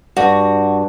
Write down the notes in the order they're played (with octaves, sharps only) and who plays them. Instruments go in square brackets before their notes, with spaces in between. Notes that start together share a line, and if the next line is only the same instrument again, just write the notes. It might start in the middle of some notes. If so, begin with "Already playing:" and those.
[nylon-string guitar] G2 [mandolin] F#4